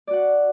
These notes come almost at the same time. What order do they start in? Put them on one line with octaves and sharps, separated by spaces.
D5 F#4 F#5